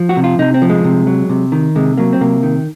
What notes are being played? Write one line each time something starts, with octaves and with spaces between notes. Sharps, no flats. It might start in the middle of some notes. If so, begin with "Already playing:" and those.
Already playing: F3
F#4
C3
F4
C3 D#4
C4
F3
G#3
C3
F#3
C3
D#3
C3 G#3
F#3 A#3
C4
C3 A#3
D#3